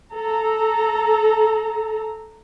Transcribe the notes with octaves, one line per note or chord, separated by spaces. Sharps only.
A4 A#5